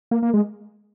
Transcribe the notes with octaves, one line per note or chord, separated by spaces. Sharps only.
A#3
A#3
G#3